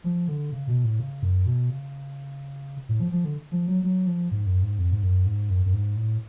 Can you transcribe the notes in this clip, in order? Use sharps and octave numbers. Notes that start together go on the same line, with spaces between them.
F3
D3
C#3
B2
A2
C#3
F#2
B2
C#3
A2
F3
F3
D3
F3
F#3
F#3
F3
G#2
F#2
G#2
F2
G#2
F#2
G#2
F#2
F#2
G#2
A2